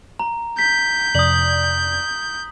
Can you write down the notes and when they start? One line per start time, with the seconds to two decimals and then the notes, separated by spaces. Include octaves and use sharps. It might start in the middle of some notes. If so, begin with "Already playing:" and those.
0.20 A#5
0.59 G6 B6
1.15 F2 C3 D5 D#6 F#7